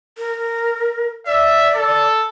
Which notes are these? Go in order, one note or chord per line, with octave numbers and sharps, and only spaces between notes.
A#4
D5 E5
A4